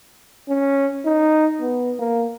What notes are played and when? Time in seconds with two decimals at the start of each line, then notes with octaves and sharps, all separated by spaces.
0.49 C#4
1.05 D#4
1.61 B3
1.99 A#3